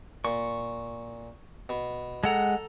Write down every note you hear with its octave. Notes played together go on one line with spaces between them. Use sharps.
A#2 C#6
B2
G#3 A4 F#5 A#5